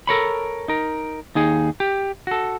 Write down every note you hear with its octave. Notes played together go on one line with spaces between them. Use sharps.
A4 A#4 C#5 B5
D#4 A#4
D#2 D#4 G#4
G4
F#4 A4